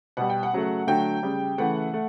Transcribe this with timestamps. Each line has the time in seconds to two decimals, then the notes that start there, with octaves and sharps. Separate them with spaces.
0.17 B2 G3 F#5
0.30 G5
0.43 F#5
0.53 C#3 F#3 A3
0.87 D3 F#3 A3 G5
1.23 C#3 G3
1.58 C#3 E3 A3 F#5
1.94 A3